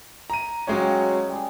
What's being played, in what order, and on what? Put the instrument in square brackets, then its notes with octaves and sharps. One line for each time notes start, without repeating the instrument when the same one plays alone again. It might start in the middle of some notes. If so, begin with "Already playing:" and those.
[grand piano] A#5 D#7
[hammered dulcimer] C#3 G4 D#5 [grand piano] F#3 G#3 C#4
[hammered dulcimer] G3 G#3